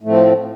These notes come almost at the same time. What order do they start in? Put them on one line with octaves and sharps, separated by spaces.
A2 A3 F3 C4